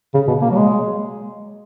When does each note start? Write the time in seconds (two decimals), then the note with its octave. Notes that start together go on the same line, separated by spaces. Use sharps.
0.14 C#3
0.28 B2
0.42 A#3
0.51 F#3
0.56 G#3